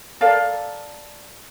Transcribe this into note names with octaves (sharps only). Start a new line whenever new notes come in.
A4 A#4 D5 F5